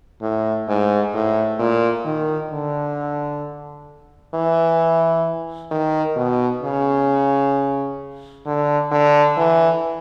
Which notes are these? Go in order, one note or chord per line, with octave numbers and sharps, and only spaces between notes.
A2
G#2
A2
A#2
D#3
D3
E3
D#3
B2
C#3
D3
D3
E3